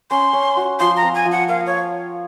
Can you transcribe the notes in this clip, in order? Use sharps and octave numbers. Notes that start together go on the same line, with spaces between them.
C#4 C6
C#4
F#4
F3 C6
A#5
C4
G#5
F3
F#5
A#3 F5
C#5